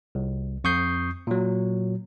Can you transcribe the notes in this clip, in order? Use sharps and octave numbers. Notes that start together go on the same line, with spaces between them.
C2
F2 C#6 D#6 G6 C7
A#2 F#3